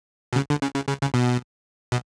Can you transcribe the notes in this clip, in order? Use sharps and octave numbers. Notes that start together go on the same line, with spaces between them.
B2
C#3
D3
C#3
C#3
C#3
C#3
B2
B2